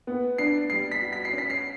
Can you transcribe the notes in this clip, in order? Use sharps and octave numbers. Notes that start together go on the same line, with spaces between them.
B3
D4 C7
G3 C7
B6
F#4
B6
C7
C#4
B6
C7